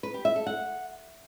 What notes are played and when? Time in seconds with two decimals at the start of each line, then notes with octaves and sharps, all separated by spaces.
0.03 B4
0.14 G4
0.25 E5
0.36 A4
0.47 F#5